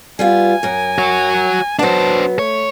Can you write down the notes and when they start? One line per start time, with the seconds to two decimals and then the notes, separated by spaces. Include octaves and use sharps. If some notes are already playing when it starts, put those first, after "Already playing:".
0.19 G3 B3 F4 G#5
0.63 F#2 A#4
0.98 F#4 C#5
1.79 F#3 B3 D4 C5 A5
2.39 A3 C#5